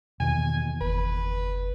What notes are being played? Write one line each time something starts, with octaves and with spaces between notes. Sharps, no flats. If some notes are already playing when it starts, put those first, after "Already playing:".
E2 B2 D#3 G#5
F#1 B4